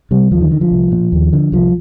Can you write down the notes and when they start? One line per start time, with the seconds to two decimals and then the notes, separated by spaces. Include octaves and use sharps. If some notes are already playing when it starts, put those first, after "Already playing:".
0.11 C3 G3
0.31 D#2 F3
0.41 D#3
0.51 D3 D#3
0.61 F3
0.71 C2
0.92 A#2
1.12 D#2
1.33 D3
1.52 C2 F3